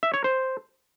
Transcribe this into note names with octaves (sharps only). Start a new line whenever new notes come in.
E5
C#5
C5